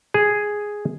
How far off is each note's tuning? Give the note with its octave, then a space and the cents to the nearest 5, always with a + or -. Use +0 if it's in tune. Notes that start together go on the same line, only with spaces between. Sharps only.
G#4 +0